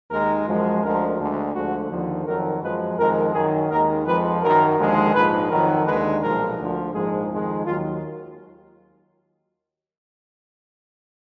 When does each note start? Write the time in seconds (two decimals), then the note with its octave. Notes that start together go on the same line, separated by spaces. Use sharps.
0.10 D#2 D#3 G#3 A#4
0.46 F#2 F3 G#3
0.82 D2 D3 F3 G#3 A#4
1.18 D2 D3 G#3
1.54 D2 D3 F3 G#3 F#4
1.90 D#2 D3 F3
2.26 F2 D#3 F#3 A#4
2.62 F#2 F3 G#3 B4
2.98 F2 D#3 G#3 A#4
3.34 F#2 D#3 F#3 G#4
3.70 D#2 D#3 G#3 A#4
4.05 F2 F3 G#3 B4
4.42 F#2 D#3 F#3 A#4
4.78 D#2 D3 F3 G#3
5.14 A#1 G#2 F3 B4
5.50 F2 D#3 F#3 A#4
5.85 D#2 D3 G#3 B4
6.22 B1 A#2 F3 G#3 A#4
6.57 D2 D3 F3
6.93 A#1 G#2 F3 G#3 G#4
7.29 F2 D#3 G#3
7.65 D#2 D#3 F#3 F4